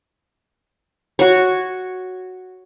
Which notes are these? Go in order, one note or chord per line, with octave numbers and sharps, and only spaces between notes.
F#4 C#5